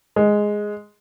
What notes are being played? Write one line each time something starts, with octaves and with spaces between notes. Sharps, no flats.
G#3